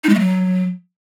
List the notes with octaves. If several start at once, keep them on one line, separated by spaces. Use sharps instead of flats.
D#4
G#3
A3
F#3